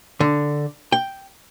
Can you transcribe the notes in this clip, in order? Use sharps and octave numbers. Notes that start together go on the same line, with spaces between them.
D3
G5